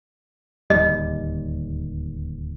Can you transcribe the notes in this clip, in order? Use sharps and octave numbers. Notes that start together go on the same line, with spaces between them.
D1 D#2 G3 D#5